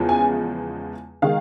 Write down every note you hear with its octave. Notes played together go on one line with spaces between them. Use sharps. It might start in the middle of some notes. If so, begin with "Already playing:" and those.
Already playing: E2 C#3 F3 G#3 B3
G#5
D#3 G#3 F5